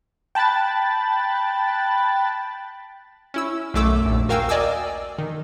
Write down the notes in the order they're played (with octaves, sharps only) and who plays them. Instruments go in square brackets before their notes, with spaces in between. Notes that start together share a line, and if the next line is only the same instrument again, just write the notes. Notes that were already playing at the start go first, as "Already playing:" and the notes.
[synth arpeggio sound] G5 A5 B5 F#6 A6
[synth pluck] C#4 E4 E6
B1 F#2 A3 D6 E6
A#1 D#2
F#4 A#4 F5 G5 G#5 E6
A#4 D5 D#5 G#5 D6 E6
D#3